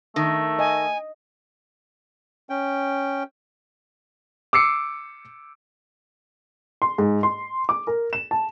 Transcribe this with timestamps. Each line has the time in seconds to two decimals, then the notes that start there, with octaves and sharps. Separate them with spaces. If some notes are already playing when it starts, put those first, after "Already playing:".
0.16 D#3 A3
0.59 D#5 G#5
2.50 C#4 G5
4.53 D6 E6 C7 C#7
6.82 C6
6.98 G#2
7.23 C6
7.69 D6
7.87 A#4
8.13 E7
8.31 A5